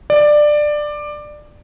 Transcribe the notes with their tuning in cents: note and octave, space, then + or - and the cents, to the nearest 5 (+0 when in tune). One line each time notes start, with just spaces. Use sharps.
D5 +15